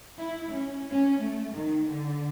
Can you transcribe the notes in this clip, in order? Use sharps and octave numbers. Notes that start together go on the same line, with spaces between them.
E4
C#4
C#4
A3
D#3
D3